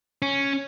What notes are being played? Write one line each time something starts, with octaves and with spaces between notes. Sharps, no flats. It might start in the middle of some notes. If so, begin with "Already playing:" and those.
C#4